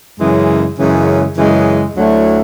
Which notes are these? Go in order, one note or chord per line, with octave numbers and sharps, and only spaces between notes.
F#2 C#3 E3 G#3
F#2 C#3 E3 G#3
F#2 C#3 E3 G#3
D2 D3 F#3 A3 E4